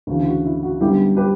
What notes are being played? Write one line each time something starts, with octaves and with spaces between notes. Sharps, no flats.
D2 C#3 E3 F#4
E4
F#4
E4
F#4
F#2 D3 G3 B3 E4 G4
G4 B4